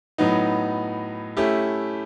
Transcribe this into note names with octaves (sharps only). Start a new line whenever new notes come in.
A2 F#3 B3 D#4
A3 C#4 E4 G4